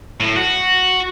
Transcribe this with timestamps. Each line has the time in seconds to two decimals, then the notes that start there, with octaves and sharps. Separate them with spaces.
0.20 A2
0.36 F#4